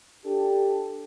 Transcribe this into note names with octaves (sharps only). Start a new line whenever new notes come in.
D4 G4 A4